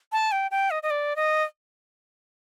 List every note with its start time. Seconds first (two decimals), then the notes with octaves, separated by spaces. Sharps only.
0.12 A5
0.32 G5
0.51 G5
0.71 D#5
0.83 D#5
0.90 D5
1.16 D#5